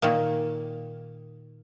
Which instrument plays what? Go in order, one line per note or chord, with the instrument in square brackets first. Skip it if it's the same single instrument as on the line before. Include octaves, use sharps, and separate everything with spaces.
[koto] A#2 D#3 A#3